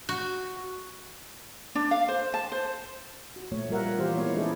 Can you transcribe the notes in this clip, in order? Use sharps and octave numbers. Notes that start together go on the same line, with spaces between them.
F#4
D4
F5
C5
A5
C5
F#4
A#2 F3 A3 C#5
F3 G3 F4 A#4 E5 F#5
E3 A#3 F4 G4 C5 F5
G#3 A#3 B3 E4 C#5 F5
C#4 D#4 E4 G#4 A4 D5